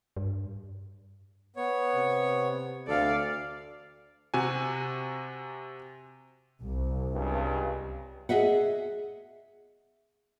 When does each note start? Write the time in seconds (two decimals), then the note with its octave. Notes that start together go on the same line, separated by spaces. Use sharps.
0.17 G2
1.56 B3 C#5
1.95 C3
2.88 D2 A4 D5 F5
4.34 C3 F#4 G#5
6.62 C2
7.13 C#2 G2
8.29 G#4 D#5 E5 F#5